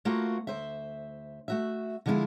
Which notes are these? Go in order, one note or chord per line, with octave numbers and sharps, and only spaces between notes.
A3 A#3 F4 F#4 B4 C5
D2 C5 E5
A3 F#4 E5
D3 F3 G#3 D4 E4 F4